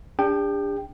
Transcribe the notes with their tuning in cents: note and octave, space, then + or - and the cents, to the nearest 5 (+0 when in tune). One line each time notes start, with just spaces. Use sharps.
D4 -15 G4 +45 G5 +0